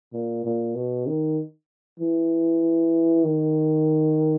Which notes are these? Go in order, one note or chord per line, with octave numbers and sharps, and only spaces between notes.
A#2
A#2
B2
D#3
E3
D#3